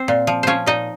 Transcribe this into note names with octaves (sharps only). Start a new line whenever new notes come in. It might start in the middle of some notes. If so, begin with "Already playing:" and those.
Already playing: C4 C5
A#2
F3
F3 C#4 C5 C#5
A#2 D#4 D#5